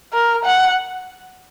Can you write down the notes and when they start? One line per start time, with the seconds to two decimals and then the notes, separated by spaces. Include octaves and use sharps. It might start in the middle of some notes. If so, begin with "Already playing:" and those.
0.13 A#4
0.45 F#5